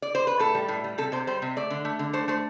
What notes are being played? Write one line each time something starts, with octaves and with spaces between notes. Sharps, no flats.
D5
C5
B4
A2 A4
G3
A2
G3
C3 A4
C3 C5
G3 C5
C3
A3 D5
D3
A3
D3
A3 C5
A3 C5